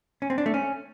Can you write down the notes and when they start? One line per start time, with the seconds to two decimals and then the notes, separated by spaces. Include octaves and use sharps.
0.22 C#4
0.30 C4
0.38 D4
0.46 A3
0.54 C#4